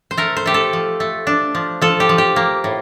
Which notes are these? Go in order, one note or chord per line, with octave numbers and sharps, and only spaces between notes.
C5
A3 A#4
C5
A3 G4
A4
F3
A3
D4
F3
F3 A4
G4
F3
G4
A#3
A2